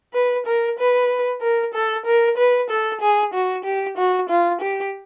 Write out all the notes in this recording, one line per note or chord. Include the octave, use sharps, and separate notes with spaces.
B4
A#4
B4
A#4
A4
A#4
B4
A4
G#4
F#4
G4
F#4
F4
G4